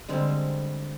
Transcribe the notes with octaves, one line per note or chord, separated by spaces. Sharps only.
D3 G3 G#3 C4